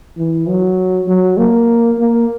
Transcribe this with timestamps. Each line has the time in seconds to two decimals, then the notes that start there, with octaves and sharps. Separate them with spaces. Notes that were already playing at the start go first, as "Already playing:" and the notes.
0.18 E3
0.48 F#3
1.08 F#3
1.38 A#3
1.99 A#3